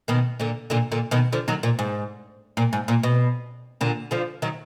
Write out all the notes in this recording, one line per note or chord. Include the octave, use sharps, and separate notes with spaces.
B2 D#3
A#2 D3
A#2 D3
A#2 D3
B2 D#3
D3 F3
D#3 F#3
A#2
G#2
A#2
G#2
A#2
B2
A#2 D3
D3 F3
D#3 F#3